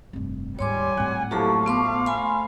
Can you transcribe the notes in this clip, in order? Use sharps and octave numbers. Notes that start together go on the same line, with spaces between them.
F1 G2
D#2 G#2 G3 C#5 G#5 C6 D6
G#1 A2 F#5
F3 F#3 A3 A#3 E4 G4 A4
A3 B3 F5 C6 D6
G#5 B5 C6